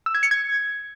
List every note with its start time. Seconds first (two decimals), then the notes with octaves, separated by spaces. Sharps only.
0.06 E6
0.15 G#6
0.23 C#7
0.31 G#6